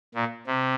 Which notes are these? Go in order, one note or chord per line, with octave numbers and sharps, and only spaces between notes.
A#2
C3